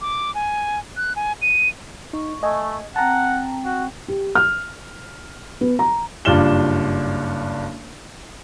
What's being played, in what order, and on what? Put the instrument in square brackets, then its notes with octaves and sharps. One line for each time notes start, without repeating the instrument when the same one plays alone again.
[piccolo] D6
G#5
F#6
G#5
D#7
[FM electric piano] D#4 [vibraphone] C#6
[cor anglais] A3 [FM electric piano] D#5 G#5
[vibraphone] C4 G5 [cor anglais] F#5 [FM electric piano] A5 A#5
[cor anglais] F#4
[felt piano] G4
F6
B3
A#5
[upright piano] F#1 G2 D4 F4 E7 G7